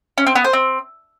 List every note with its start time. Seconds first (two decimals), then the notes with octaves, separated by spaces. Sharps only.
0.18 C#4
0.27 C4
0.35 B3
0.44 C5
0.53 C4